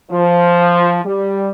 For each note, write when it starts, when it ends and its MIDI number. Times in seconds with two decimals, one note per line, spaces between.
0.11 0.99 53
1.05 1.51 55